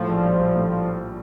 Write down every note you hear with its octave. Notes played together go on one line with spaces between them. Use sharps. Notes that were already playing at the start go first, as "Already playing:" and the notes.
Already playing: A2 F3
A#1
G3
A#1
A2